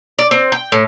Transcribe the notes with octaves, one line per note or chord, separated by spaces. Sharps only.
D5
C4
G5
A2